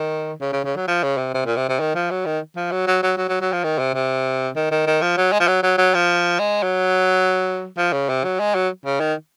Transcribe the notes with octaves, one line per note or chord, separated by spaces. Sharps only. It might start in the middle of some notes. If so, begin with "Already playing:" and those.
Already playing: D#3
C#3
C#3
C#3
F#3
F3
C#3
C3
C3
A#2
C3
C3
D#3
F3
F#3
D#3
F3
F#3
F#3
F#3
F#3
F#3
F#3
F3
D#3
C3
C3
D#3
D#3
D#3
F3
F#3
G#3
F3
F#3
F#3
F#3
F3
G#3
F#3
F3
C#3
C3
F#3
G#3
F#3
C#3
D#3